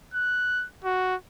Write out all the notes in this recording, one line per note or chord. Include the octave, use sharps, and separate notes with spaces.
F#6
F#4